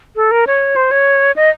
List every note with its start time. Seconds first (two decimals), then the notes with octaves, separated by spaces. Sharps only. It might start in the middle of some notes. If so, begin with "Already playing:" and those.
0.16 A4
0.31 A#4
0.47 C#5
0.76 C5
0.91 C#5
1.36 D#5